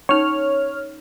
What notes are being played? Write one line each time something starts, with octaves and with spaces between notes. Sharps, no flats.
C#4 D#4 C#5 F6